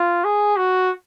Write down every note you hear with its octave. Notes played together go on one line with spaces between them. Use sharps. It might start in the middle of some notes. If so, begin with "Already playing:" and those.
Already playing: F4
G#4
F#4